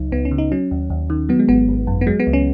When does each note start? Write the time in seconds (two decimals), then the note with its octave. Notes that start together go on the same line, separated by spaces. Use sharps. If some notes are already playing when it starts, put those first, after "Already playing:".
Already playing: C#2 F#3 D#4
0.12 C#2 B3
0.25 C#4
0.31 C#3
0.38 D#4
0.52 F#3 C#4
0.71 D#2
0.90 D#2
1.10 D#3
1.29 F#3 B3
1.39 G#3
1.48 G#1 B3
1.69 G#1
1.87 F#2
2.01 B3
2.07 F#3 G#3
2.20 B3
2.27 C#2
2.33 C#4